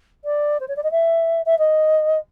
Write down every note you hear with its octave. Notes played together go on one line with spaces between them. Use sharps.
D5
C5
C#5
D5
D#5
E5
E5
D#5